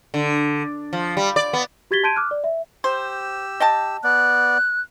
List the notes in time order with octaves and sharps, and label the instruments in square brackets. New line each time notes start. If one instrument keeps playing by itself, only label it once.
[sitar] D3
F3
G3
D5
B3
[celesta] F#4 G4 G#6 A6 B6 G7
A5 C6 G6 G#6 D7 D#7
D6 F6 F#6
D5
E5
[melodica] G4 E6 [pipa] C5
[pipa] D#5 G5 A5
[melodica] B3 D5 [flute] F#6